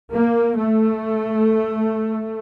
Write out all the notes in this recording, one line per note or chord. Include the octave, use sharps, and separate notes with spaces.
A#3
A3